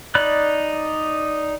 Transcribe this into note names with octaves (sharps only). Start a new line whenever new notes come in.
D#4 D5 B5 F#6